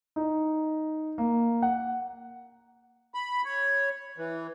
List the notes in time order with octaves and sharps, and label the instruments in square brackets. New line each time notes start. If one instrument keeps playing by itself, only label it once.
[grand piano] D#4
A#3
F#5
[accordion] B5
C#5
E3